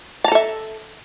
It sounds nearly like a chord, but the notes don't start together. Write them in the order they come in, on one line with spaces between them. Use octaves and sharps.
A5 A#5 A4 E5